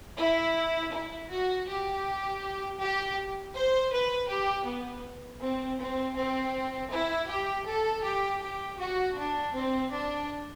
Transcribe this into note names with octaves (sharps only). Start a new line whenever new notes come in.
E4
E4
F#4
G4
G4
C5
B4
G4
B3
C4
C4
C4
E4
G4
A4
G4
G4
F#4
D4
C4
D4